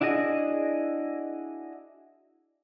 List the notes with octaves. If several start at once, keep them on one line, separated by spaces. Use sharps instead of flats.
D4 E4 F#4 G#4 D#5